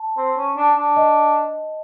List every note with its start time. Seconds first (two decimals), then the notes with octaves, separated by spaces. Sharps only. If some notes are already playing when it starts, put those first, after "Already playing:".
Already playing: A5
0.18 C4
0.38 C#4
0.57 D4
0.77 D4
0.96 D#5